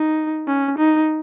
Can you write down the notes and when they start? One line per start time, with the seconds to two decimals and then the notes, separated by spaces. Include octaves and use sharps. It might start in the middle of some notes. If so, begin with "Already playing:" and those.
Already playing: D#4
0.48 C#4
0.78 D#4